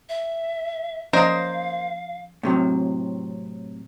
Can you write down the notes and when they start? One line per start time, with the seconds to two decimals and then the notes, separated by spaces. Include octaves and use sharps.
0.09 E5
1.13 F3 A#3 C#4 C5 D#5 F5 A#5
2.43 A2 C3 F#3